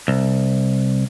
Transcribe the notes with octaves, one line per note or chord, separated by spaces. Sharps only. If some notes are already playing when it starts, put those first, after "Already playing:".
C2